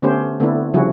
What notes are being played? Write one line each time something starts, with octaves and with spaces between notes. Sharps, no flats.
D3 A3 B3 C#4 G4 C5
D3 A3 B3 C4 D4 E4
C#3 F3 G3 E4 F#4 G#4